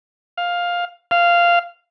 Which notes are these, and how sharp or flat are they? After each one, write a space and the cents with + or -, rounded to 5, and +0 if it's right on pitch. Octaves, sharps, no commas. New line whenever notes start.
F5 +10
F5 -10